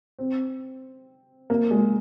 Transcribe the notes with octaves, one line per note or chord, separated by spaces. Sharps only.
C4
A#3
G#3